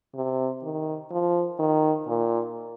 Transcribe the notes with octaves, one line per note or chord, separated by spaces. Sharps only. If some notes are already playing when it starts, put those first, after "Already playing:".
C3
D#3
F3
D#3
A#2